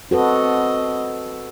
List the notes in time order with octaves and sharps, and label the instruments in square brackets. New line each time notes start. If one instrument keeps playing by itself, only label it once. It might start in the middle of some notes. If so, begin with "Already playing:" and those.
[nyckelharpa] C4 D#5 [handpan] F#4 A4 B4